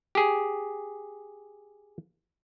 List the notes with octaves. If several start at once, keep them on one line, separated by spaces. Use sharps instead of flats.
G4 G#4